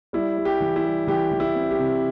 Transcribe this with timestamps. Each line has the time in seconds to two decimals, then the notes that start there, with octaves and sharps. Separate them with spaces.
0.13 G3 E4
0.37 G3
0.45 G4
0.60 E3
0.76 E4
0.85 G3
1.07 E3 G4
1.32 E3
1.40 E4
1.55 C4
1.71 G4
1.79 C3